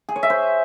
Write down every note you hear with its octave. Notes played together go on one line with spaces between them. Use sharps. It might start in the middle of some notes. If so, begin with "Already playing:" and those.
G#4
C#5
E5
C5